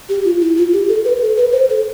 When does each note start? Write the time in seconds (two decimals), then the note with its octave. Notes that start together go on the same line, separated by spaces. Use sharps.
0.09 G4
0.25 F4
0.41 E4
0.57 F4
0.73 G4
0.89 A4
1.05 B4
1.22 A4
1.37 B4
1.53 C5
1.70 A4